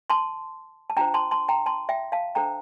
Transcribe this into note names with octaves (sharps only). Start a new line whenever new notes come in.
A5 C6
A5
D4 F4 C5 G5 A#5
A5 C6
A5 C6
G5 A#5
A5 C6
E5 G5
F5 A5
D4 A4 C5 G5 A#5